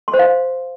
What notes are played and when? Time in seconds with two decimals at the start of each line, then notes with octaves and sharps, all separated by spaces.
0.08 C6
0.14 C5
0.19 F5